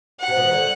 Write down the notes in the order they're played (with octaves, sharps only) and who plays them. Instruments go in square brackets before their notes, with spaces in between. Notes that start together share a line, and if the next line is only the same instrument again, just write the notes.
[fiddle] F#5
[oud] C3
B2
D#3
D3